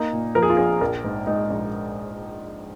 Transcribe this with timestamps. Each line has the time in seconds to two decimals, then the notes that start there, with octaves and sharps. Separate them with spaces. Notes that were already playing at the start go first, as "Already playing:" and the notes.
Already playing: A#3 D#4
0.13 A#2
0.35 F3 A#4
0.43 G#4
0.50 F4
0.57 A#1 G#4
0.81 A#1 A#4
1.04 G#2
1.27 G#3 D#4
1.50 A#1